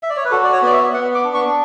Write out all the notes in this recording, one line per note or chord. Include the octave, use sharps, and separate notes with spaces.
E5
D5
C#5
B4
F#4 A4
D5
C#5
B3 D5
E5
B3 F#5
D6
D4
C#6